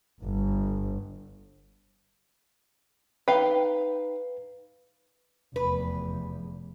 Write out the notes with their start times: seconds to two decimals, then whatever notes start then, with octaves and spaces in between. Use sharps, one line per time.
0.23 G1
3.28 D#4 B4 F5 G5
5.56 F1 E2 B4